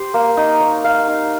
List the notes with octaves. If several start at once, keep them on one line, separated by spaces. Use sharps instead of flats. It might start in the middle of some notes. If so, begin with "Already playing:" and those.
Already playing: G4 C5
A#3
D#4
C#5
F5
D#4